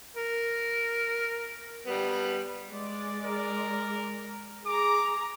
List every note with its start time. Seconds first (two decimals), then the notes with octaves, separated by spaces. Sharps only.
0.17 A#4
1.86 G3 B3
2.68 G#3 D5
3.26 A#4
4.66 G#4 A#5 D6